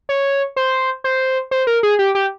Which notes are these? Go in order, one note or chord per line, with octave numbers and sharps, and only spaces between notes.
C#5
C5
C5
C5
A#4
G#4
G4
G4